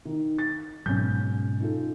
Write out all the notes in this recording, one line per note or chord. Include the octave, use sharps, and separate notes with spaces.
D#3
A6
G#2 B2 F#3 C#4 G6
D#4 F4 A4